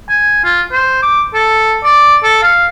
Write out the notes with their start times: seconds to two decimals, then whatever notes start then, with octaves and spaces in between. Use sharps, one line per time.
0.09 G#5
0.44 F4
0.73 C5
1.02 D6
1.34 A4
1.84 D5
2.24 A4
2.43 F5